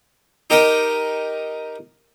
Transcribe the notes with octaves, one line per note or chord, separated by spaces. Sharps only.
D#4 G4 A#4 D#5